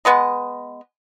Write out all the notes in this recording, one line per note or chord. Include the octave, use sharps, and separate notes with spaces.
G#3 B3 B4 D#5